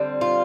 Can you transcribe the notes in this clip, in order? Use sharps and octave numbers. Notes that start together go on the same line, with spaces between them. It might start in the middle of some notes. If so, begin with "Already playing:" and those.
Already playing: D3 G3 C4
F4